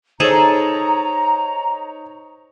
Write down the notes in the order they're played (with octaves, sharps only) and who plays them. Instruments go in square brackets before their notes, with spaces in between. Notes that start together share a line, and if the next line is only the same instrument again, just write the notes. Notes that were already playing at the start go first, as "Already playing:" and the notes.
[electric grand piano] D#4 C#5 [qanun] G#4 A4 [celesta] C5 [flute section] A#5